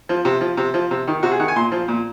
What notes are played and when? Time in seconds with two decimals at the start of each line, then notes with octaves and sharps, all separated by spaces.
0.09 F3
0.25 C3
0.41 F3
0.57 C3
0.74 F3
0.91 C3
1.07 D#3
1.23 C3 F#4
1.32 G#4
1.40 D#3 F#5
1.48 G#5
1.56 A#2 C6
1.72 F3
1.88 A#2